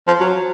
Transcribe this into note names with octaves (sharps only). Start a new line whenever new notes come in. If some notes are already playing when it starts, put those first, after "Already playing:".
F3
F#3